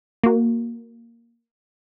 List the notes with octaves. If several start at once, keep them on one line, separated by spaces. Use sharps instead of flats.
A#3 F#4